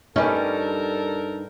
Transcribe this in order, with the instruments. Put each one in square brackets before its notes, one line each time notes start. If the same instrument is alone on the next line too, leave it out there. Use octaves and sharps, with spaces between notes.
[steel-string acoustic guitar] G2 D#4 [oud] G3 C#4 [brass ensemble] A4 A#4